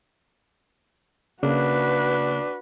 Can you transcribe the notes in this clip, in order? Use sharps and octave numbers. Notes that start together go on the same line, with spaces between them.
C#3 A#3 D4 F#4 B4